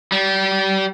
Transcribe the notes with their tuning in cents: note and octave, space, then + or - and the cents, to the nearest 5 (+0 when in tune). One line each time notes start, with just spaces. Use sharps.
G3 -30